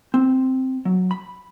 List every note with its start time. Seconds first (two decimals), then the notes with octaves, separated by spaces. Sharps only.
0.14 C4
0.85 F#3
1.11 B5